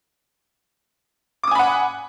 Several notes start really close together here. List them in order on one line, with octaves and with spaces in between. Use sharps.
D6 D#6 G#5 B5 F#5